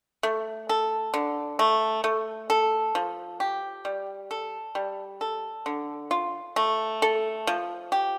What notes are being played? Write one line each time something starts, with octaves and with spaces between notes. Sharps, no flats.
A3
A4
D3
A3
A3
A4
F3
G4
G3
A4
G3
A4
D3
F4
A3
A4
F3
G4